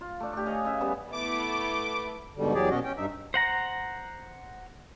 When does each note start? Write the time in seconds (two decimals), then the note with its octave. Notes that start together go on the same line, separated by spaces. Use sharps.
0.01 F4
0.20 A3 D4
0.33 D4 G4
0.46 C#5 D#5 F5 G#5
0.65 C#3 E5 G#5
0.80 G3 B3 C#4
1.12 A3 B3 E4 D6
2.37 G#2 B2 D3 G3
2.54 E2 F#3 G4 G#4 D5
2.70 B2 C#4 F#4 D#5
2.84 C#4 G5
2.97 G2 D#4 E5
3.34 C5 F#5 A#5